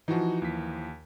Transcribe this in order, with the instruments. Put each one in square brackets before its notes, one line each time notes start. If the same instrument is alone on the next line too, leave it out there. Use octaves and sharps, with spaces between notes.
[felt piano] E3 F3 [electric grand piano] D#4 F#4
[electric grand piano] D#2 B6